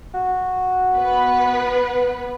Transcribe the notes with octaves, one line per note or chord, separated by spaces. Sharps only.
F#4
B3 B4